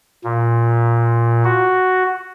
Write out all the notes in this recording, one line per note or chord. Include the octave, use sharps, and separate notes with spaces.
A#2
F#4